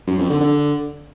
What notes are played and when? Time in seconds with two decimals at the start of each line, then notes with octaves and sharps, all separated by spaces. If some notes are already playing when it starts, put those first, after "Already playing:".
0.07 F#2
0.18 F2
0.29 D3
0.41 D3